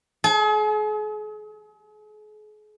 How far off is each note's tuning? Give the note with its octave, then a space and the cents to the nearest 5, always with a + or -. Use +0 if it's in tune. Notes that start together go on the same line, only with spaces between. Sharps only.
G#4 +40